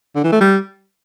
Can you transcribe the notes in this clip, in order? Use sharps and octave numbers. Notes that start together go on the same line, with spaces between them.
D3
E3
A3
G3